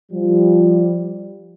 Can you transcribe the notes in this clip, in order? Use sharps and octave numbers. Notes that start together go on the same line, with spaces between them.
F3 G3